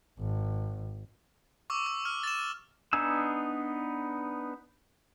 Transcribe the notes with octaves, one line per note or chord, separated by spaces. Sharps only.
G#1
C#6 D6 E6
E6
F6
A6 E7
B3 D4 D#4 G#5 E6